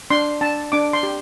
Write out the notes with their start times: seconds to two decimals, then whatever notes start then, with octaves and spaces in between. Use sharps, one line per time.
0.10 D4 C6
0.41 D4 A5
0.72 D4 D6
0.93 C6
1.03 G4